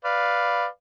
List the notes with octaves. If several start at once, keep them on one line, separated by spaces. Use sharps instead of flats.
B4 D5 F5